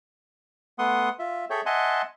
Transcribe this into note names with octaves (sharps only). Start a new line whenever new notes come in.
A3 B3 F#5 C6 D#6
F4 E5
G#4 A4 C#5 E5 G5
D#5 E5 F#5 G#5 A5 C6